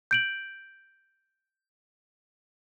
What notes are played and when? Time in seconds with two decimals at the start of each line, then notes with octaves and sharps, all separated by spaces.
0.11 G6 D7 F#7